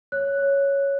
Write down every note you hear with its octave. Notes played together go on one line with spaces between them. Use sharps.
C#5 F#6
C#5